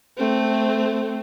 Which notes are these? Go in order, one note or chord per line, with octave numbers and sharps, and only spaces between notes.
A3 C4